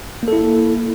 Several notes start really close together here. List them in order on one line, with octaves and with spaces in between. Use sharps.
A#3 A4 E4